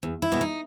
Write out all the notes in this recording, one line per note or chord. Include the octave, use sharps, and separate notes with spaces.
E2
E4
B2 G#3 B3
D#4